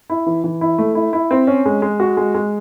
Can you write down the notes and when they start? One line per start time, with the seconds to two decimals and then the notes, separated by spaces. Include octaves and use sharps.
0.10 E4
0.26 E3
0.44 E3
0.61 E4
0.78 A3
0.95 E4
1.13 E4
1.31 C4
1.47 C#4
1.66 G#3
1.82 G#3
2.00 F#4
2.17 G#3
2.35 G#3